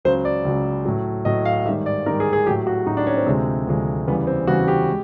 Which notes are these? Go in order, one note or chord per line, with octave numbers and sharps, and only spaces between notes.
C#2 C#3 F#3 C5
D5
C#2 C#3 F#3
A2 F#3
A2 F#3 D#5
F5
G#2 D#3 G3 E5
D5
G#2 D#3 G3 A#4
G#4
G#4
A2 F#3 G4
F#4
A2 F#3 D#4
D4
C#4
C4
D2 C3 F3 G#3
D2 C3 F3 G#3
E2 C#3 E3 G3 B3
C4
E2 C#3 E3 G3 F#4
G4
G#3